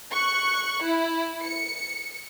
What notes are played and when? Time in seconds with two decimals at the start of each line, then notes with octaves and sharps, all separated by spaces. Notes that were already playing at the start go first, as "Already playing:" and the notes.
0.12 C#6 F#6 C#7
0.84 E4
1.44 C#7